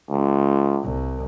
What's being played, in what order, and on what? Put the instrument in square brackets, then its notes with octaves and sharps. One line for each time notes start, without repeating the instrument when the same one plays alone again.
[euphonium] C#2
[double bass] C2